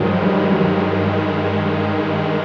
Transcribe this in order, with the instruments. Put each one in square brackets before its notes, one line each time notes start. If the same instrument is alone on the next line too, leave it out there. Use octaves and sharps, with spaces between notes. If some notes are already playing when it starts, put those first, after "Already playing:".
Already playing: [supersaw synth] G2 D#3 G#3 [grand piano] F3 F#3
[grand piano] G3
F#3